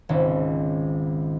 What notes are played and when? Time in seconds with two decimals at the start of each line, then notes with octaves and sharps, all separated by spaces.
0.09 G#1 C#2